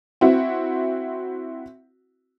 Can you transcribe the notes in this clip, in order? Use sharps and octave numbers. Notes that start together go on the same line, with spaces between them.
C4 E4 F#4